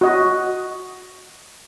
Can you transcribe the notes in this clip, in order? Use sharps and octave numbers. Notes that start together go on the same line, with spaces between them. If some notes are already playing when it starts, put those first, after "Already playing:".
F#4 D#5